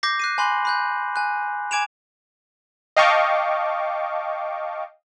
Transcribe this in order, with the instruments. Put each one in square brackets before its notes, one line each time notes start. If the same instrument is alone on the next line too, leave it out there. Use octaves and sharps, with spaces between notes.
[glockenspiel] D6 G6 A#6 C7
F#6 C7 D#7
G#5 B5 C6 F#6 F#7
B5 F#6 G6
G#5 F#6
G#5 D6 G#6 D7 E7 F7
[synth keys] D#5 F5 G5 A5 C#6 D6